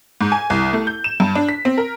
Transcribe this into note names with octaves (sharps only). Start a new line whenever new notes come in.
G#2
G#5
C2
A3
G6
E7
G2
D4
B6
C4
A#4